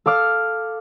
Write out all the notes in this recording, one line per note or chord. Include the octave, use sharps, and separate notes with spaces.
A4 F5 D6 F6